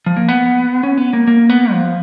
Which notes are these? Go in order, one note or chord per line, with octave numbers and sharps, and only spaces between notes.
F3
A#3
B3
C#4
B3
A#3
A#3
B3
F3